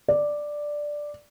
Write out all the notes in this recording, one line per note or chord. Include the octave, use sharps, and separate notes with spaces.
D5